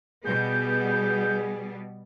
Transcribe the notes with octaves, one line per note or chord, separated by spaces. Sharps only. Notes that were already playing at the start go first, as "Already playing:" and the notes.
B2 G3 B3 G#4 G6